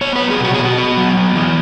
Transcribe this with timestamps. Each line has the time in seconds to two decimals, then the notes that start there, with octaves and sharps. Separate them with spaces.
0.01 B3 C#5
0.16 F#3 B4
0.30 G#4
0.40 B2 F#4
0.54 B2 G#4
0.65 F#4
0.78 B3
0.97 F#3
1.17 B3
1.36 E3